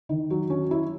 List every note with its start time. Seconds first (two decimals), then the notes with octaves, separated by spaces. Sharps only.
0.09 D#3
0.30 F#3
0.50 C#4
0.71 E4